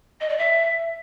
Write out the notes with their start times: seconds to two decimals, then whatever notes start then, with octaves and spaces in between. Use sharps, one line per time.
0.21 D#5
0.29 D5
0.38 E5